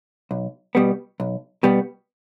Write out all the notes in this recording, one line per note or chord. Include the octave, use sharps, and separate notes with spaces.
B1
B2 G3 B3
B1
B2 G3 B3